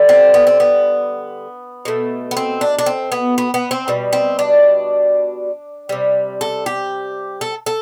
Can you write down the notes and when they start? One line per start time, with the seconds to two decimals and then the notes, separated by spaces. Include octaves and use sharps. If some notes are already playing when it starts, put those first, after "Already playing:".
Already playing: D3 G3
0.09 C4
0.34 B3
0.47 C4
0.60 B3
1.85 B2 A3
2.31 B3
2.37 C4
2.61 D4
2.79 D4
2.86 C4
3.12 B3
3.38 B3
3.54 B3
3.71 C4
3.88 B2 G3
4.13 C4
4.39 D4
5.89 C3 G3
6.41 A4
6.66 G4
7.41 A4
7.66 A4